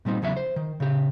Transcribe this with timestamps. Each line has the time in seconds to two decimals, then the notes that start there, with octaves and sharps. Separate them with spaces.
0.05 A#2 G3 C4 D#4
0.22 E2 C#3 F#3 F#4 E5
0.37 C5
0.56 D#3
0.80 C#3 G4